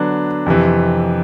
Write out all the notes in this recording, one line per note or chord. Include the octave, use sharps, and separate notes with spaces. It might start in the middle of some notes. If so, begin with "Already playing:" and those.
Already playing: D3 F#3 B3 D4
F2 C3 E3